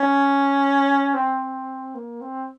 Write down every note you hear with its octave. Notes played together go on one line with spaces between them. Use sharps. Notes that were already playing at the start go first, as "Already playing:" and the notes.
Already playing: C#4
C4
A#3
C4